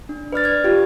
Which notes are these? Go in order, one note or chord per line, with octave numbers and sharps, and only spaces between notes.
D4
B4 D5 F6 A6
F6 G#6
F4 G4